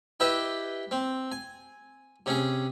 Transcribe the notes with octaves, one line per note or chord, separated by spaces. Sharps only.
E4 G4 B4 D#5 E5 G5
C4
G#5
C3 C#4 G#4 G#5